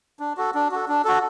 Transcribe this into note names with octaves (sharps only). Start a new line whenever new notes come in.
D4
F#4 A4
D4
F#4 A4
D4
F#4 A4